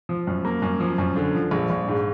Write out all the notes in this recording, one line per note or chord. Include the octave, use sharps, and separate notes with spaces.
F3
F#2
A#3
F#2
F3
F#2
D3
F3
A#1
A#1
G#2